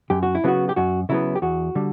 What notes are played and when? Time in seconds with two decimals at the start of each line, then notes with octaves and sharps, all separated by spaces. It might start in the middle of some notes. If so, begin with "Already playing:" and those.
0.10 F#2 G4
0.23 F#4
0.35 E4
0.44 C#3 F#3 B3 F#4
0.69 G4
0.76 F#2 F#4
1.09 C#3 F#3 B3 E4
1.35 G4
1.42 E2 F#4
1.75 D3 G3